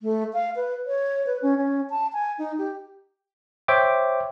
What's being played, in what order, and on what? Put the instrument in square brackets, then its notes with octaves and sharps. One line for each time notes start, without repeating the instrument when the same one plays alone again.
[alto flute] A3
F5
B4
C#5
B4
C#4
C#4
A5
G#5
D#4
G4
[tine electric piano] C5 C#5 E5 G5 D6